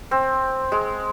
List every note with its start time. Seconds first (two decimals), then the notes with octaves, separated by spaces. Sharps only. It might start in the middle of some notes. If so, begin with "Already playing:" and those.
0.11 C4
0.72 G#3